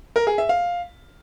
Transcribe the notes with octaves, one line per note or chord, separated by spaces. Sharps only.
A#4
G#4
E5
F5